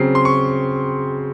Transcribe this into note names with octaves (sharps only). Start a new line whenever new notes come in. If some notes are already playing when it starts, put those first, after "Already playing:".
Already playing: C#3 F#3 C4 C7
C6
C#6